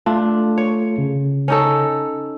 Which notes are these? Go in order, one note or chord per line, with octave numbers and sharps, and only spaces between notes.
A3 D4 F4 A4
C#5
C#3
C#4 D#4 A4